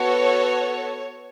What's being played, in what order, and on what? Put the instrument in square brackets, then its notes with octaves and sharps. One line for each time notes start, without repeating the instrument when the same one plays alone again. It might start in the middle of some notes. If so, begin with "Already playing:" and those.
Already playing: [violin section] B3 F#4 A4 C#5